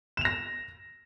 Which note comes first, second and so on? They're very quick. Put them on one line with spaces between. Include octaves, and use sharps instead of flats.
E7 F7 A#6